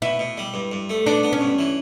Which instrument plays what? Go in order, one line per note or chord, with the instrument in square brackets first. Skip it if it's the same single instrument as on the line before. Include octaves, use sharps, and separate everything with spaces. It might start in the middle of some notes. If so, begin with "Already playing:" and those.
[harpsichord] B2 [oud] E4
[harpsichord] B2
G3
G2
G2
A3
[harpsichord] B3 [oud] D4
[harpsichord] B3
[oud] C#4
[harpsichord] G2
E3